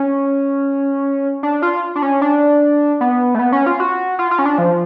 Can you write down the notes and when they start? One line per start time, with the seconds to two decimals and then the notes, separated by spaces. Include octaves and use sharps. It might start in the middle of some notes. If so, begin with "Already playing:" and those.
Already playing: C#4
1.43 D4
1.62 F4
1.95 D4
2.02 C#4
2.21 D4
3.01 B3
3.35 A3
3.39 B3
3.52 C#4
3.66 F4
3.80 F#4
4.19 F4
4.31 F4
4.39 C#4
4.45 D4
4.58 F3